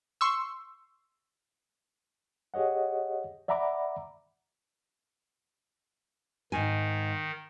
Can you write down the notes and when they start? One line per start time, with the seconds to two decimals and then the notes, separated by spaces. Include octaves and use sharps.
0.21 C6 C#6 E6
2.54 G4 G#4 C#5 D#5 F#5
3.48 D5 E5 F#5 A#5 B5 D6
6.52 G#2 D#3 G#5